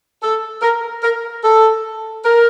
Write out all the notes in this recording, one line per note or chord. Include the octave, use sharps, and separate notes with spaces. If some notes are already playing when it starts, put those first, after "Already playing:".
A4
A#4
A#4
A4
A#4